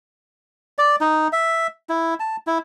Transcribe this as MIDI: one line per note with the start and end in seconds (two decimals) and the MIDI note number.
0.78 0.96 74
1.01 1.28 63
1.33 1.67 76
1.89 2.14 64
2.20 2.36 81
2.47 2.58 64